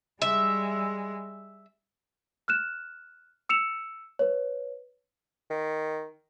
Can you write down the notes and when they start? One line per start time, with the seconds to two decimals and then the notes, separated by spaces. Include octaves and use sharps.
0.22 G3 G#3 E5
2.48 F6 F#6 E7
3.49 E6 C#7 E7 F7
4.19 B4 C#5
5.50 D#3